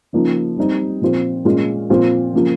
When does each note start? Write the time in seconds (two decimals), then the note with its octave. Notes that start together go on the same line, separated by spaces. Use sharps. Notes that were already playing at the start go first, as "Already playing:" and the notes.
0.13 C#3 F3 A#3 D#4
0.57 G3 C4 D#4
1.01 A#2 F3 C4 F4
1.45 A#2 G#3 C#4 F4
1.90 A#2 F3 C4 F4
2.33 C#3 F3 A#3 F4